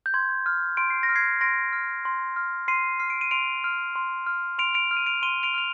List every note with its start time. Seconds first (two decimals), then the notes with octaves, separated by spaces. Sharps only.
0.06 G6
0.14 C6 G#6
0.46 F6
0.77 C6 D7
0.90 C7
1.03 A#6
1.09 F6
1.16 G#6 C7
1.41 C6 A#6 D7
1.72 F6
2.05 C6
2.36 F6
2.68 C6 C7 D#7
3.00 F6 C7
3.10 D7
3.21 D#7
3.31 C6 D7 F7
3.64 F6
3.96 C6
4.26 F6
4.58 C6 D7 F7
4.74 D7 F7
4.91 F6
4.97 D#7
5.06 D7 F7
5.22 C6 D#7 G7
5.43 D7 F7
5.54 F6 F7